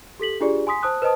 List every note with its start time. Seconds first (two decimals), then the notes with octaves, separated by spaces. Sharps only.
0.19 G4 A4 B6 F#7
0.41 D4 F4 G4 G#4 D5
0.67 G#5 C6 D#6 B6
0.83 C5 A5 D#6 F#6
1.02 B4 C5 D#5 A5 D#6